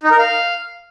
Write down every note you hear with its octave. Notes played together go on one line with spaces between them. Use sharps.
D#4
A#4
F5